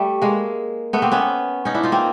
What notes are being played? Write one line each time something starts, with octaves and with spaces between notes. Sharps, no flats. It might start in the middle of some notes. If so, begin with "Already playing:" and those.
Already playing: G3 A3
G#3 A#3
A3 B3
A#3 C4
B3 C#4
C#4 D#4
D4 E4
D#4 F4
A#3 C4